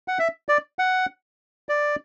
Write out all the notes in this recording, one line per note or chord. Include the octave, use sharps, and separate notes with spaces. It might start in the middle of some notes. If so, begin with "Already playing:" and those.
F#5
E5
D5
F#5
D5